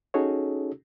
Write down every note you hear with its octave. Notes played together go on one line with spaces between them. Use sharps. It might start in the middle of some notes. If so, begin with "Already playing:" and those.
C#4 D#4 F#4 G#4 A4 C#5